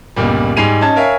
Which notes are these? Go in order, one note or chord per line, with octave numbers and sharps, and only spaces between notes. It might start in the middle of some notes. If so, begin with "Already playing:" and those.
G1 C#2 A#2 G3
G#2 G3 G#5 C7 D#7 F7
C#4 D#4 A5 G#6
A#4 C#5 E5 F5 G#5